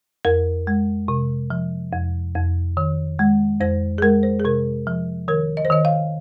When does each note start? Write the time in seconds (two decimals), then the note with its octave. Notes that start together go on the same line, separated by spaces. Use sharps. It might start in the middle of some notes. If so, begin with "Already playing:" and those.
0.25 F2 A#4
0.67 G#3
1.08 C3
1.50 F3
1.92 F2
2.35 F2
2.77 D#3
3.19 G#3
3.61 F2 C5
3.98 G#4
4.02 G#3 A#4
4.23 C5
4.40 G#4
4.45 C3 A#4
4.87 F3
5.28 D#3 A#4
5.57 D#5
5.65 C5
5.70 D#3 D#5
5.85 F5